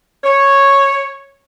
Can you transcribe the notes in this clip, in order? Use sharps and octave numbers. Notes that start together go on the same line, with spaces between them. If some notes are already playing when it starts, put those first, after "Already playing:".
C#5